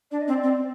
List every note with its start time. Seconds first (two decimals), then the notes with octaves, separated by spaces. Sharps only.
0.11 D4 D5
0.21 D#5
0.28 C4
0.31 D5
0.43 C4